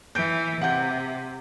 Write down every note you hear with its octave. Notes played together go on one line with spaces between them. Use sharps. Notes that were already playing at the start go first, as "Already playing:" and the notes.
E3 G6 D7
C3 F#5 G6